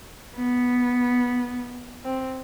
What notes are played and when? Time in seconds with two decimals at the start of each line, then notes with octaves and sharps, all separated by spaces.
0.36 B3
2.05 C4